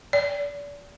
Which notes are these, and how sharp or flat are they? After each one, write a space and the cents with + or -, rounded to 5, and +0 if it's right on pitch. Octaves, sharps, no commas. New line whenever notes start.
D5 -35